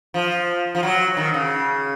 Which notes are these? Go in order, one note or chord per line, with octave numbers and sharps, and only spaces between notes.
F3
F3
F#3
D#3
C#3